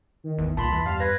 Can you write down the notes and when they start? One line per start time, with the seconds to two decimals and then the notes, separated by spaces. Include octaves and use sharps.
0.24 D#3
0.38 A1 E2
0.57 C2 A#2 A5 B5 C6
0.72 E2 E3
0.86 G2 F5
1.00 B4 G#6 A#6